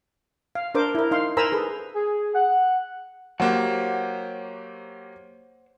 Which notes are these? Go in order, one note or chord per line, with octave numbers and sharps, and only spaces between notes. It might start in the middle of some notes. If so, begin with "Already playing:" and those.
F5
D4 A#4 C5 D6
E4 A#4
D#4 F5 C6
A#4 C5 G#5 A#5 B5 E6
G#4 A4 B4
G#4
F#5
F#3 A#3 G4 C5 C#5 F#5